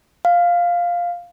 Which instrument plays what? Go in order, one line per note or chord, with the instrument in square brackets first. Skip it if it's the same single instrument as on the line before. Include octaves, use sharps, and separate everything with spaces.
[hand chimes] F5